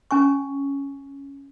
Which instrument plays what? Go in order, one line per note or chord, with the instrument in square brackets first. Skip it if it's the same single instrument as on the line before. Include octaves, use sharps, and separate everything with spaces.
[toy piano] C#4 G#5 C#6